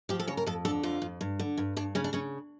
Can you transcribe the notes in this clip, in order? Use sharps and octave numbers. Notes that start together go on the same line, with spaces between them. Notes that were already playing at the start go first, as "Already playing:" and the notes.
F3 G4
A4
C#3 C#5
A#4
F2 A4
D3 A4
F2 F4
F2
G2
D3
G2
G2 D4
C#3 C#4
D4
C#3 C#4